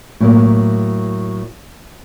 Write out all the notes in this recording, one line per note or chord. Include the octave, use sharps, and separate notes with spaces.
A2 F#3 A#3